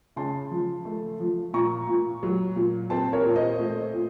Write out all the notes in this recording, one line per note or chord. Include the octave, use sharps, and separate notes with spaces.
C#3 A5 C6
F3
A3
F3
A#2 A#5 C#6
A#2
F#3
A#2
C4 A5 C6
A#4 C#5
A#2
C5 D#5
A3
A#2